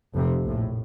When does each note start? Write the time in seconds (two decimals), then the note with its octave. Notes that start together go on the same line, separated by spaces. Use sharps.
0.14 F1 F2 C3
0.43 A#1 A2